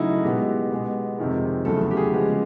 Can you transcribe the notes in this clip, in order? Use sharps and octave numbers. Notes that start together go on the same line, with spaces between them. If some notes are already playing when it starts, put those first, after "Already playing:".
Already playing: C#3 F#3 A3 D#4 E4
F#4
B2 G#3 B3 G4
B2 G#3 B3
F2 C3 D#3 G#3
E2 C#3 F#3 A3 A4
A4
G4
G#4
C#3 F3 G#3 B3